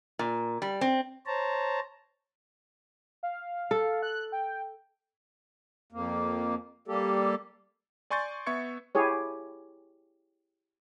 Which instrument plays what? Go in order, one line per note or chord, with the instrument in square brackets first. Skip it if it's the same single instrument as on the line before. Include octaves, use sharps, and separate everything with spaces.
[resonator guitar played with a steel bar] A#2
G3
C4
[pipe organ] C5 C#5 A5 A#5
[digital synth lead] F5
[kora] A4
[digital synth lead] F#6
G5
[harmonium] F2 A#3
G3 A#3 G4 A4
[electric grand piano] D5 G#5 C6 C#6 G6 A6
B3 E5 C#6 G#6 C#7
[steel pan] E4 G4 G#4 C#5